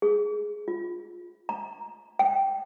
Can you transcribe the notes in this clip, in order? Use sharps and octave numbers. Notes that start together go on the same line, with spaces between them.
G#4
F4
A#5
G5